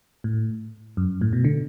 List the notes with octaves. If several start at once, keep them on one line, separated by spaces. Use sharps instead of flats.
A2
F#2
A2
B2
D3